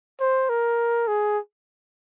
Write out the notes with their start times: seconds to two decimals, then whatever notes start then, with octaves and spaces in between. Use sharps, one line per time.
0.20 C5
0.49 A#4
1.07 G#4